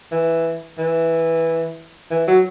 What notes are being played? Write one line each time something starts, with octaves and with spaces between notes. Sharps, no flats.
E3
E3
E3
F#3